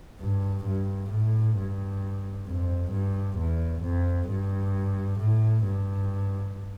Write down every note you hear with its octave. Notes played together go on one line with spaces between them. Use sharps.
G2
G2
A2
G2
F2
G2
E2
F2
G2
A2
G2